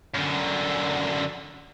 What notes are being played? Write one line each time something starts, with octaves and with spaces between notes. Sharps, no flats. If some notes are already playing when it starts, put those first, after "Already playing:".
F#2 D3